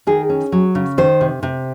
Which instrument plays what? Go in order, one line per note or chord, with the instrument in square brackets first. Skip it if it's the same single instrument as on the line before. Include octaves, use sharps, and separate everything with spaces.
[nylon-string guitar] D#3 G#4
C#4
F#3
C#3
D#3 C5
C3
C3